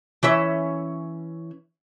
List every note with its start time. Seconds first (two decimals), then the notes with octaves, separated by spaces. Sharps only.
0.23 E3 C#4 E5